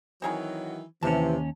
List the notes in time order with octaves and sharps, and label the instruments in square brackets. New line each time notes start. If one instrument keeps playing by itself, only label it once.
[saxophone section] D#3 E3 F#3 [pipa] C4 G#4 A#4
[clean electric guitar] D#2 C#4 [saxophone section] C3 [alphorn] E3 [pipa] A5